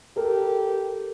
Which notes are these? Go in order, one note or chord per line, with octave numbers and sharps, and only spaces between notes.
G4 A4 A#4